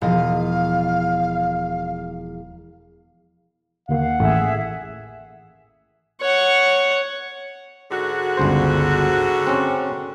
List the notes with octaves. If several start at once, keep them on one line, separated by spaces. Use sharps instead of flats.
E1 F3 D#5 F5
D#2 A#3 F5 F#5
A1 G#4 A4 E5
C#5 F#5
G#2 D3 F#4
G1 C#2 C5
C4 C#4